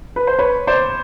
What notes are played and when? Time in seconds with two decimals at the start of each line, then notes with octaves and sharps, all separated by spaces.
0.16 B4
0.27 C5
0.39 B4 C#5
0.67 C5 D5